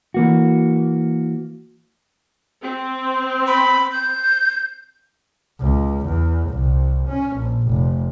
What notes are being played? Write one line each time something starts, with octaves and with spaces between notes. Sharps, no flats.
E3 A#3 F#4
C4
B5
G6
C#2
E2
C2
C#4
A#1
F1